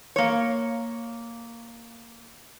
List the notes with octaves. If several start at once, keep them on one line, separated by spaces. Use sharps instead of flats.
A#3 C#5